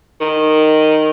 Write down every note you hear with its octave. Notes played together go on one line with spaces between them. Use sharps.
D#3